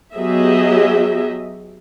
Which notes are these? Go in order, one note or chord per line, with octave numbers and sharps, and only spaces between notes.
F#3 B3 G4 G#4 D#5 E5